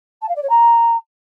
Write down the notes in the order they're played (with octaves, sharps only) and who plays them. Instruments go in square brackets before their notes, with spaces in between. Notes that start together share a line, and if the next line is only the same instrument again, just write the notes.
[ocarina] A5
F5
D5
C#5
A#5